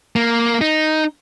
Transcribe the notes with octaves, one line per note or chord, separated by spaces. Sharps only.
A#3
D#4